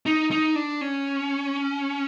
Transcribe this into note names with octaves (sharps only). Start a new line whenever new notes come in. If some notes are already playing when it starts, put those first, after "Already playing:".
D#4
D#4
D4
C#4